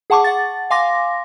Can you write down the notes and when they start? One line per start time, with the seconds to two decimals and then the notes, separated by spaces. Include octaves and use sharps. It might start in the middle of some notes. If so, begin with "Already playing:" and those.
0.10 G#4 F#5 A5 C#6 D6
0.24 F#5 A6
0.70 F5 G#5 C6 D6 A#6